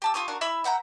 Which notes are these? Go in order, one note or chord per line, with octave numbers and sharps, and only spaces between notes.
G4 A5 E6
F4 G4 C#5 D#6
D4 F#4 A#4 F5
E4 E5 B5 E6
E5 F#5 G5 A#5